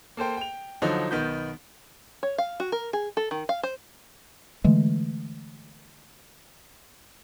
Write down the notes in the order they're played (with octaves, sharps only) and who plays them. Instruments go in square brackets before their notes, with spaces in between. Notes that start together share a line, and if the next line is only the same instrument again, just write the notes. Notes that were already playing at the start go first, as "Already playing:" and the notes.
[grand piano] A#3 A4 C5 G5
G5 F7
D3 F3 F#3 D#4
B1 D#3 B3 G6
[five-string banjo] C#5
F5
F#4
A#4
G#4
A4
D#3
F5
C5
[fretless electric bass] D3 E3 G#3 A3